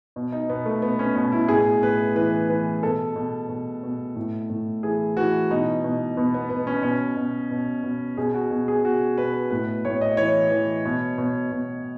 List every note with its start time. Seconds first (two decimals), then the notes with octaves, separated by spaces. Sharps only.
0.16 B2
0.32 D#4
0.49 B2 B3
0.66 A3
0.82 B2 B3
0.99 C#4
1.16 B2 C#4
1.32 E4
1.48 A2 G#4
1.83 A2 B4
2.15 E3 B4
2.49 E3 B4
2.83 B2 A4
3.16 B2
3.49 B2
3.83 B2
4.16 A2
4.50 A2
4.83 E3 G#4
5.17 E3 F#4
5.51 B2 D#4
5.84 B2
6.17 B2 B3
6.34 B3
6.50 B2 B3
6.67 C#4
6.83 B2 C#4
7.17 B2
7.51 B2
7.83 B2
8.17 B2 G#4
8.34 F#4
8.51 B2
8.68 G#4
8.84 B2 F#4
9.18 B2 B4
9.50 A2 B4
9.85 A2 C#5
10.01 D#5
10.17 E3 C#5
10.51 E3
10.85 B2
11.18 B2
11.52 B2